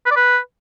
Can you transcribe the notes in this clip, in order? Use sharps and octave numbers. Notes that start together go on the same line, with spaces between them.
B4
D5
B4